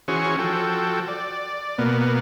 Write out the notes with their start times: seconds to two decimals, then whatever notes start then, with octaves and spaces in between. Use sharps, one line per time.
0.08 E3 C#4 F#4 G#4 C5 C#6
0.39 F3 F#4 A4 G5
1.08 D5
1.78 B2 A#3 B3